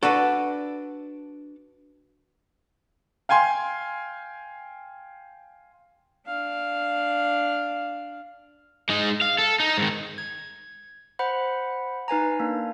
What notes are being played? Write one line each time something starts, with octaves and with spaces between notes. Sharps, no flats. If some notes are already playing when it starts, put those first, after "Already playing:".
D4 F#4 A4 B4
F5 G5 G#5 C6
D4 F5
G#3 D#4
F5
A4
D#4
G#2 D#3
G#6
C5 F#5 B5
D#4 B4 G#5 A#5
A#3 D4